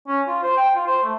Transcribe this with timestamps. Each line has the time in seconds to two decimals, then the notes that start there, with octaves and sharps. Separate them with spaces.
0.08 C#4
0.27 F4
0.43 C5
0.57 G5
0.75 F4
0.87 C5
1.02 A3